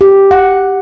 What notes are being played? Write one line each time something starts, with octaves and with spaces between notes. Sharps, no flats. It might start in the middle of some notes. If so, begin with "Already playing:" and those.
G4
F#5